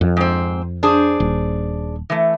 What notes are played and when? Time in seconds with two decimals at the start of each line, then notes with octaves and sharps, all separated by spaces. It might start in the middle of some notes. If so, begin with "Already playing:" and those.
0.01 F2
0.17 G#2 C4
0.83 D4 G#4 C5
1.20 D#1
2.10 E3 A3